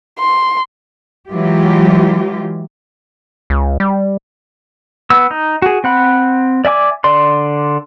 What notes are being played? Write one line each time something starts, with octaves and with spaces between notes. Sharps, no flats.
C6
E3 F#3 G#3 F4 G4
C#2
G3
B3 E6
D#4
F#4 G#4
C4 F#5 B5
D5 E5 G#5 D6
D3 D5 C6